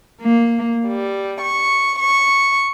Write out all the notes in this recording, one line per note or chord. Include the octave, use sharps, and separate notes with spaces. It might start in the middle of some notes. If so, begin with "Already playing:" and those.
A#3
G3
C#6
C#6